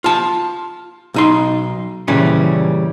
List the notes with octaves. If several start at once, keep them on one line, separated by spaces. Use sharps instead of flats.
F4 A5
B1 D#4 C6
A#2 C#3 E3 G3 C#4